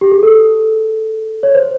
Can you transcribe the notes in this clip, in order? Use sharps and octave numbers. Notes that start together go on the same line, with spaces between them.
G4
G#4
A4
C#5
C5